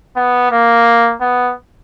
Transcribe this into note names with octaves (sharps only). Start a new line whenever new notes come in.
B3
A#3
B3